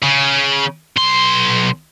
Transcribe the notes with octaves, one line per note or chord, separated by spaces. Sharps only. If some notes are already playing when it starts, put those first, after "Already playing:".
C#3
B1 C6